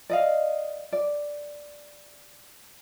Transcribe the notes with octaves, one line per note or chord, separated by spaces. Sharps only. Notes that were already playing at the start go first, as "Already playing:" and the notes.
D5 D#5 F5
D5